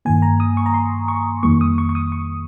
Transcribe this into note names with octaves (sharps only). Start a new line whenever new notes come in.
G2 D#3 A#3 G#5
A#5
D#6
C#6
A#5
C6
C#6
F2 D#3 G3 A#3 C#6
D#6
C#6
C#6
D#6
C#6